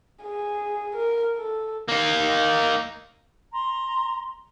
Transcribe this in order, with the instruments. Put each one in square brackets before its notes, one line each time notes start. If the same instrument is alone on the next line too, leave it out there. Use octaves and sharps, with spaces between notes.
[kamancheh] G#4
A#4
A4
[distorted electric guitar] A#3 D#4
[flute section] A#5 C6